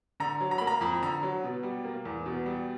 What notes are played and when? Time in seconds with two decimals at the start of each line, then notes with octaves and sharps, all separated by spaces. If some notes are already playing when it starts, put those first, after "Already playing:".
0.20 D3 A#5
0.41 F#3
0.51 A#5
0.58 B5
0.61 A#3
0.67 A#5
0.81 F2 B5
1.03 D3 A#5
1.23 F#3
1.44 B2
1.63 G3
1.85 A#3
2.05 E2
2.26 B2
2.46 G3